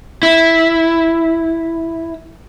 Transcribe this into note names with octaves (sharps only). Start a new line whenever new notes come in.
E4